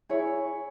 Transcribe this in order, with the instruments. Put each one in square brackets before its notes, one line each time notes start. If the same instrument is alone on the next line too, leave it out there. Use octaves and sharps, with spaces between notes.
[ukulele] E4 G#4 C#5